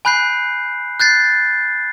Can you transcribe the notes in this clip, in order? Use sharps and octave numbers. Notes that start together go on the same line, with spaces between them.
G#5 B5 F#6 G6 C7
F#6 G6 A6 C7